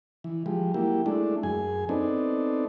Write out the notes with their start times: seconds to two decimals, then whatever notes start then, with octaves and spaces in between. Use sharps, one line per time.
0.24 E3
0.46 F3 G3 G#3
0.74 F#3 A#3 E4 G4
1.06 G#3 A3 D4 E4
1.43 F#2 G#4 G#5
1.89 B3 C4 D4 D#4 A4